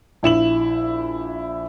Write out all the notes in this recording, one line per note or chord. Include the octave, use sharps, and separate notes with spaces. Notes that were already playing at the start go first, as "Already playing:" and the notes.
A#1 E4 E7 F#7